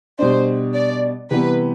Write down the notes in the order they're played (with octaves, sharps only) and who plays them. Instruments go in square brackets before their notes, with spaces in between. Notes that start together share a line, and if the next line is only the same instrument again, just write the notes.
[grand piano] B2 G3 D4 [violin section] C5
[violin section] D5
[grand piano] C3 E3 G3 B3 [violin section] B4